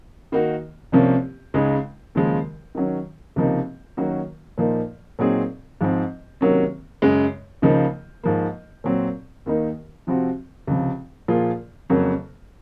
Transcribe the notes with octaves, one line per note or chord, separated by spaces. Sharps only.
D#3 A#3 D#4 F#4
C2 C3 F3 A#3 C#4
C#2 C#3 G#3 D#4 G#4
D#2 C#3 F3 G#3
D#3 F#3 C#4
C#2 C3 F3 A#3 D#4
D#3 F#3 A#3 C#4 F#4
A#2 F3 A#3 D#4
A#2 F#3 C4 D#4 G#4
G#2 F3 C4
C3 D#3 F#3 A#3 C#4
F#2 C#3 G#3
C#2 C#3 F3 A#3 D#4
G#2 F3 A#3
A#2 F#3 C4
D#2 D#3 A#3 D#4
C3 F3 C4 F#4
C#2 C3 F3
A#2 F3 A#3 F4 G#4
F2 C#3 F#3 A#3